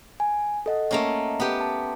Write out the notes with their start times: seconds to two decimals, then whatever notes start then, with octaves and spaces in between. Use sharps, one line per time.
0.20 G#5
0.66 A4 D#5 F#5
0.91 A3 A#3 C#4
1.40 B3 G4
1.61 A5